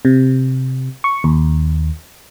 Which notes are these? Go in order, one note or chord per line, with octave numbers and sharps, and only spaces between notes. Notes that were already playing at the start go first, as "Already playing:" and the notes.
C3
C#6
D#2